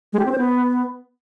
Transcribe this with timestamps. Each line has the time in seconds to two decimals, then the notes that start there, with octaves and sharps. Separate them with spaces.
0.13 G#3
0.19 G4
0.25 C4
0.32 C5
0.38 B3